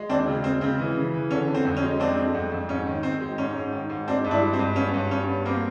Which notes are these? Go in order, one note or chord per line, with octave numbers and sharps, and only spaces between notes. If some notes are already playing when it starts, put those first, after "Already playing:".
Already playing: G#3
D#2 C4 D4
C#3
G#3 C4
C#3 C4
E3
C#3
E3
D3 C#4
D3
C4
F2
C#4
G#3
F2 C4 D4
G#3
F2
F2
G#2 C#4
D#3
D#3 C4
G#3
G#2 C#4
G#2
D#3
G#2
G#3 C4 D4
G2
D4 E4
G#3
C4
G2
B3 C#4
G2
G2 C#4
B3
A#3 C4